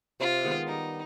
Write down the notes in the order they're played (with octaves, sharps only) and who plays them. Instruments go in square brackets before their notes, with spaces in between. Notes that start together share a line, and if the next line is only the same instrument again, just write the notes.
[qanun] C3 [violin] F4
[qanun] D#3 G#3 B3
[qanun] G3 [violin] D#4